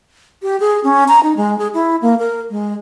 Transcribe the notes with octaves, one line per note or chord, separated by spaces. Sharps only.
G4
G#4
C#4
A#5
D#4
G#3
G#4
E4
A#3
A#4
G#3